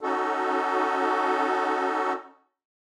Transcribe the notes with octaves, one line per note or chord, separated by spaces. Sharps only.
C#4 D#4 F#4 A4